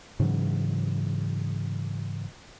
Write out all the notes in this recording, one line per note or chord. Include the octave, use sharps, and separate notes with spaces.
G#2 C#3 E3 F#3